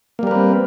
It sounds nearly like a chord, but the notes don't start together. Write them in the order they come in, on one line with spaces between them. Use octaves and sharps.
A#3 G3 A#4 B4 C4